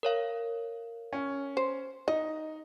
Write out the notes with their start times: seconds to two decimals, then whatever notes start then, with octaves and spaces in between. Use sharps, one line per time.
0.03 A#4 C#5 F5
1.13 C#4
1.57 C5
2.08 D#4 D#5